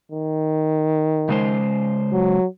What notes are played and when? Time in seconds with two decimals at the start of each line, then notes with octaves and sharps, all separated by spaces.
0.12 D#3
1.29 C#3 G#3 C5
2.12 F#3